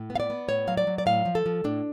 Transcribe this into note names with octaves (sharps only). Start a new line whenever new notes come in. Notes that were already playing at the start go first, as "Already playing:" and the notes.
Already playing: A2
B3
F5
D5
B3
A2 C#5
F#3 F5
D5
F#3
D5
A2 F5
F3
A4
F3
A2 D4